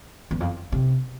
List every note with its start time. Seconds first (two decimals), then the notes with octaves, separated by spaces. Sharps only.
0.31 E2
0.40 F2
0.72 C3